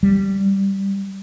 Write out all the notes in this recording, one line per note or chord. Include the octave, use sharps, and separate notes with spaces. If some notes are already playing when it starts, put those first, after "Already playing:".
G3